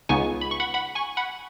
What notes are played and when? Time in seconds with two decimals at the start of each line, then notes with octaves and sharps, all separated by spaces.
0.09 C#2 C#3 B3 D#4 G#5 C#6
0.41 B5
0.51 C#6
0.60 F#5 B5
0.74 F#5 B5
0.95 G#5 C#6
1.17 F#5 B5